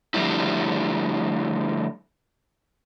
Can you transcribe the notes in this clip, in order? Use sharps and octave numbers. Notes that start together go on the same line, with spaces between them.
D3 F3 G3 A3 E4